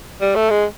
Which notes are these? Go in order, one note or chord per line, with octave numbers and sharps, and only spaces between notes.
G3
A3
G#3